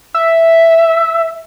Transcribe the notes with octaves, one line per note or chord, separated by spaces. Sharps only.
E5